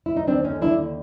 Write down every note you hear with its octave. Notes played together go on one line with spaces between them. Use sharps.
E4
D#4
D#2 C4 D4
C#4 D#4
D3
D4 E4
D#2